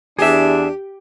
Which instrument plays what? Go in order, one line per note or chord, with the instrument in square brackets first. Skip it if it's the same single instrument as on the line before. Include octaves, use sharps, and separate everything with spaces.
[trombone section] E2 D4 [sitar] G4 [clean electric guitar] G#4 E5